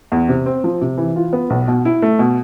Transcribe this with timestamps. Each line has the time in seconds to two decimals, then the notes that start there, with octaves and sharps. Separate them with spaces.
0.12 E2
0.29 C3
0.46 C4
0.64 F3
0.81 C3
0.98 E3
1.16 F4
1.33 B3
1.50 B1
1.68 B2
1.85 E4
2.02 A3
2.19 B2